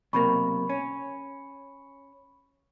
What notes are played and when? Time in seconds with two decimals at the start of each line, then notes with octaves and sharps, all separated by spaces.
0.13 B1 C3 A#3 B5 C#6
0.69 C#4